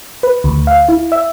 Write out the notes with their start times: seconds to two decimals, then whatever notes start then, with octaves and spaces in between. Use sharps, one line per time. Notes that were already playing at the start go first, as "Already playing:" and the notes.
0.23 B4
0.44 D2
0.67 F5
0.88 E4
1.12 E5